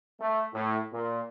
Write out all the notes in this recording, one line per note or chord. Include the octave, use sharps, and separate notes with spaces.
A3
A2
A#2